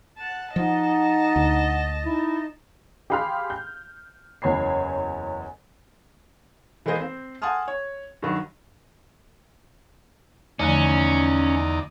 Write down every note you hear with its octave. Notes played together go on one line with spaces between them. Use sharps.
F#5 A5
F3 D#4 D#5 F#5 A5
D2
D#4 E4
G4 G#4 F5 B5 C6 F6
G6
F#1 E2 C#5 B5 C7
E3 G#3 A#3 C5 D#5
C4 C5
F#5 G#5 A5 C6 D#6 F6
C#5
G2 D#3 F#3
E2 D3 F3 A3 C#4 D#4 D5